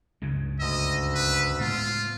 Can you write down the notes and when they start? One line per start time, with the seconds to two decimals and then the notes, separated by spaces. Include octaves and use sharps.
0.22 C#2 G2 C#3
0.60 D2 D#5 E6
1.15 B4
1.60 A2 G#3 B3 F4